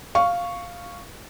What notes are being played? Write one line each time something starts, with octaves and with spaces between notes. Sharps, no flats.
F5 C#6